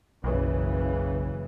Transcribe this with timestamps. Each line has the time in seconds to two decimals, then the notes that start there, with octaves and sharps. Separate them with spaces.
0.24 F#1 B1 C#3 E3